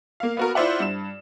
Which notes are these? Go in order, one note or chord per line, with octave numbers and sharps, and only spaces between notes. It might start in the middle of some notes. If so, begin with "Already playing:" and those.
A#3 F5
B3 F#4 A#4
E4 F4 C5 D5 E5 F#5
G2 E7